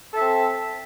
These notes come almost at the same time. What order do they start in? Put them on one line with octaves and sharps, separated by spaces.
A4 E5 C4